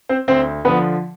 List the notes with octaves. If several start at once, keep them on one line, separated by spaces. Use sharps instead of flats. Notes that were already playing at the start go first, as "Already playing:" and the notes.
C4 C5
D2 C4 C5
D3 F3 B3 B4